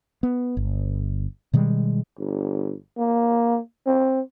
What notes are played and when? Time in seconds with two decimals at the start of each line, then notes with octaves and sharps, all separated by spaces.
0.23 B3
0.57 G1
1.53 B2 D#3 G3 G#3
2.19 G1
2.98 A#3
3.87 C4